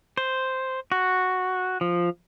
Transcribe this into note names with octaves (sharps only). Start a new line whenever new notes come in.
C5
F#4
F3